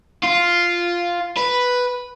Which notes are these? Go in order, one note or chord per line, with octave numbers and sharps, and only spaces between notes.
F4
B4